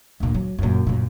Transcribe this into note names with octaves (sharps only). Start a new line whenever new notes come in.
D2 A#2
F#3
F#2 A#2
F#2 A#2